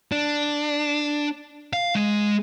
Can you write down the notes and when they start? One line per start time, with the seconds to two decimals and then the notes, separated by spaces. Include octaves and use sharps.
0.12 D4
1.73 F5
1.95 G#3